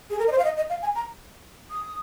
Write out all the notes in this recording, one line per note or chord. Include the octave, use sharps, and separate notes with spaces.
G#4
A#4
D#5
C5
F5
D#5
D#5
F5
G#5
A#5
D#6